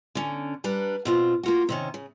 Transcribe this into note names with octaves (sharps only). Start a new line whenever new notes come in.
D3 C#4
G3 D4 B4 A#5
B2 C4 F4
A#3 F4 F#4
C3 D#3 C#4
C#3